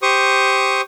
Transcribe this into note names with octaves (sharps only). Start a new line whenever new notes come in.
G4 C5 C#6 D#6